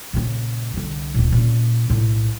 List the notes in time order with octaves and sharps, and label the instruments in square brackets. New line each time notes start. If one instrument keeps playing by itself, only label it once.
[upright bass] A#2 C#3
C2 D3
D1 A#2
A#2 C#4
B1 A2